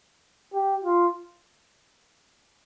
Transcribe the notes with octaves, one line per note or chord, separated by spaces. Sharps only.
G4
F4